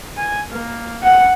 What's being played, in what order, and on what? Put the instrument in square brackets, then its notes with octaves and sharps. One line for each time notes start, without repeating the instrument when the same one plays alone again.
[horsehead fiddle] G#5
A#3
F#5